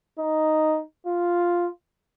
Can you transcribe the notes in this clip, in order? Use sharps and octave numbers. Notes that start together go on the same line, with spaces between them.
D#4
F4